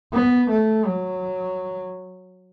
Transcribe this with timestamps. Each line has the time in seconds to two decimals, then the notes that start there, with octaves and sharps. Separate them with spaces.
0.13 B3
0.50 A3
0.85 F#3